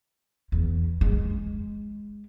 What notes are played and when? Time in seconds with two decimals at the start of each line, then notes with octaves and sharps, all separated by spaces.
0.52 E2
1.01 G#3